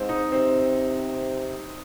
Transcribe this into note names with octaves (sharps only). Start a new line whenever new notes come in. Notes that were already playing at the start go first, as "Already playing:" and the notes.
Already playing: G#2 C4
D#4
C3 C4